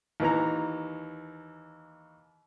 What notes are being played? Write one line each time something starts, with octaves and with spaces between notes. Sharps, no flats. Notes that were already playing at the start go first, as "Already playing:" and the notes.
D#2 E3 A#5